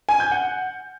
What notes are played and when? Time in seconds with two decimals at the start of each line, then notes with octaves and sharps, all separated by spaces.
0.09 G#5
0.20 G6
0.31 F#5